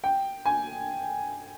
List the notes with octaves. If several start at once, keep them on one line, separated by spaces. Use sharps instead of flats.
G5
G#5